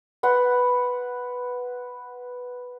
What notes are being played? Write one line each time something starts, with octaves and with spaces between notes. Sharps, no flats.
B4 F#5 C6